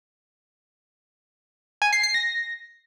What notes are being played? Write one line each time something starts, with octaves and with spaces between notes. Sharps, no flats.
G#5
C7
C7
A#6